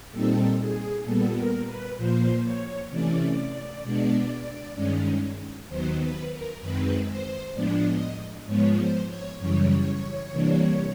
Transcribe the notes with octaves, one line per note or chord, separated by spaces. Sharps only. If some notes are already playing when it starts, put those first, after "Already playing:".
A#2 G3 C4 D#4 A4
G#4
A#2 G3 B3 A4
A#4
B4
A#2 F3 A#3 C5
C#5
C3 E3 A3 C#4 D5
B2 G#3 B3 D4
G2 D#3 G#3 C#4
D#2 D#3 F#3 B3 C5
B4
A#4
F#2 D#3 G#3 C4 B4
C5
A2 F3 G#3 B3 D4 D5
D#5
G#2 F3 G#3 B3 C#5
C5
C#5
F#2 C#3 E3 G3 C#5
C3 E3 G3 A#3 D4